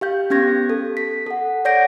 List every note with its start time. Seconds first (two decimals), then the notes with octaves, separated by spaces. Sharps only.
0.01 G4 F5 G6
0.30 B3 C#4 G4 G#6 A#6
0.70 A4
0.97 B6
1.26 A4 F#5
1.65 C#5 D5 F#5 G6 A#6 D7